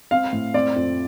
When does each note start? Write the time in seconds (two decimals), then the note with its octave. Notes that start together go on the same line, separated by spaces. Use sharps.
0.11 C4 F5
0.33 A2
0.54 C4 D5
0.76 F2